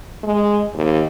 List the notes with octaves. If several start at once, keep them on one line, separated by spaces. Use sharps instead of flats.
G#3
D#2